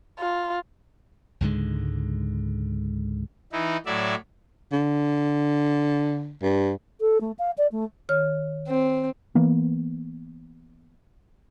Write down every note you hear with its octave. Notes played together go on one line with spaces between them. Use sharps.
F4
C#2 G#2 D3 G#3
E3 D#4 E4
A2 F#3 D5 E5
D3
G2
A4
A3
F5
D5
A3
D#3 C#5 F6
C4
E3 A#3 B3